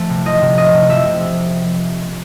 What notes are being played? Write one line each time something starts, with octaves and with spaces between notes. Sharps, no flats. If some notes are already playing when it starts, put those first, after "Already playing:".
Already playing: F3 A3
C3
F3 D#5
C3
A3 D#5
C3
F3 E5
C3